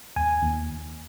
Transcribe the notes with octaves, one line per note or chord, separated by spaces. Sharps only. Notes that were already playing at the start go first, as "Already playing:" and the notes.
D#2 G#5
D#2